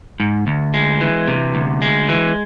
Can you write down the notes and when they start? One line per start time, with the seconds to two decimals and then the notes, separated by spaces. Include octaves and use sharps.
0.20 G#2
0.47 D2
0.74 G#3
1.01 E3
1.28 C3
1.55 D2
1.82 G#3
2.09 E3